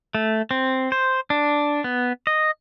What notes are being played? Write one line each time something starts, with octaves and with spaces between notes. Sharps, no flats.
A3
C4
C5
D4
B3
D#5